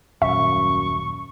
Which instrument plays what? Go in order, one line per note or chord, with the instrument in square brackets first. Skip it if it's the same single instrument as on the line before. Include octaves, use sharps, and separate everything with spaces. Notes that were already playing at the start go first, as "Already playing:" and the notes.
[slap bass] D#1 [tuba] F#2 [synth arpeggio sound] E5 [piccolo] C#6